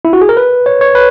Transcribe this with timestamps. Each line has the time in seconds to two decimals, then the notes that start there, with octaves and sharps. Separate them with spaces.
0.05 E4
0.13 F#4
0.21 G#4
0.29 A#4
0.37 B4
0.66 C#5
0.81 C#5
0.95 B4